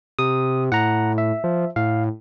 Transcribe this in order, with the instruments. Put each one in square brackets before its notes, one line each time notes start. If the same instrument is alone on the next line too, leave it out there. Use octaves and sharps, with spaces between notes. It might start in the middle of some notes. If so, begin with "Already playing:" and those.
[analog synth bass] C3 [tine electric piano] D#6
[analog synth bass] A2 [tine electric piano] F#5 A#5
[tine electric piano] E5
[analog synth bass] F3
[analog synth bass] A2 [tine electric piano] F5